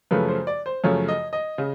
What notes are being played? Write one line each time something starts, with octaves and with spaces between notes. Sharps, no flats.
F#2 C#3 F3 A3 B4
C5
D5
C5
F#2 C#3 F3 A3 C#5
D#5
D#5
C#3